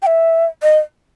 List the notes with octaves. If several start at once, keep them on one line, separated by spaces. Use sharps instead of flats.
G5
E5
D#5